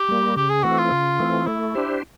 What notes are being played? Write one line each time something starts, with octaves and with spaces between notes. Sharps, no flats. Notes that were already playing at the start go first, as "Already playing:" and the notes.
Already playing: G4
G3 A#3
C#3 G4
G#4
E3 A3 C4 F#4
F4
C#3
E3 A3 C4
A3 E4
D4 G4 C5